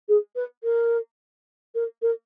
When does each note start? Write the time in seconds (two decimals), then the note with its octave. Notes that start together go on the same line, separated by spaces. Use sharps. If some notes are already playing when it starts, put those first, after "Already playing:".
0.09 G#4
0.36 B4
0.64 A#4
1.75 A#4
2.02 A#4